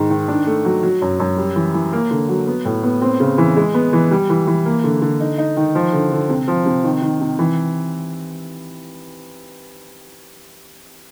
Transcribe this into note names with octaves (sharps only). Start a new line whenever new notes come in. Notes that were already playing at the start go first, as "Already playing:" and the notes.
Already playing: G#2 D#3
D#3
D4
A3
F#3
F#3
F#2
F#2
G3
E3
E3
A#3
D3
F#3
B3
A2
B3
C4
C#3
E3
G#3
B3
E3
G3
E3
E3
A#3
D3
D3
D#4
D#4
D#3
F3
D3
D3
C3
F3
C3
D#3
D#3
C3
E3